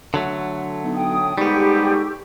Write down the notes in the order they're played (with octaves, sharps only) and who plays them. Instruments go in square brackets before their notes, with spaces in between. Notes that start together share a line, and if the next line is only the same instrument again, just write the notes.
[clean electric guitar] D3 F#3 A3
[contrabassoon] B1
[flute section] G5 D#6
[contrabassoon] G#2 [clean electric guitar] G3 B3 [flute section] G4 A4 C#6